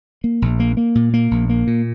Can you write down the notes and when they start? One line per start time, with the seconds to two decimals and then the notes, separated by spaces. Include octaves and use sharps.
0.24 A#3
0.42 A#1
0.60 A#3
0.77 A#3
0.95 A#2
1.14 A#3
1.31 A#1
1.49 A#3
1.67 A#2